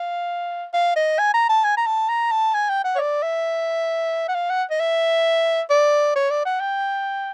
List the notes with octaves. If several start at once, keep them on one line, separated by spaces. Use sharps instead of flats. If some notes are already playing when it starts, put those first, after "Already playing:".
Already playing: F5
F5
D#5
G#5
A#5
A5
G#5
A#5
A5
A#5
A5
G#5
G5
F#5
C#5
D5
E5
F#5
F5
F#5
D#5
E5
D5
C#5
D5
F#5
G5